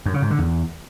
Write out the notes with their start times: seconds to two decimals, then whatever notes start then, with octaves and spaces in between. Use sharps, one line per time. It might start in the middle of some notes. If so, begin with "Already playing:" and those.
0.06 F#2
0.14 C#3
0.22 G#2
0.30 D3
0.39 E2